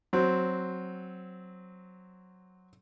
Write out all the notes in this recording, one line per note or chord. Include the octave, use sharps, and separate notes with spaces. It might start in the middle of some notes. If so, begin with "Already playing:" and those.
F#3 C4